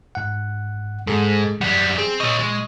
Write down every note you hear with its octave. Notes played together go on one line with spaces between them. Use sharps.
G#2 F#5
G#2 G#3 G#4 A4
F#2 G3 F#5
C4 G#4
A#2 C#5 D#5 C#6
G#3